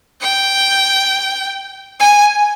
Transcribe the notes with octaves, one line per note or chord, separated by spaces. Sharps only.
G5
G#5